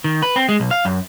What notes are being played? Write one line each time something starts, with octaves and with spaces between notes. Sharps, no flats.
D#3
B4
C4
G#3
B1
F5
F#2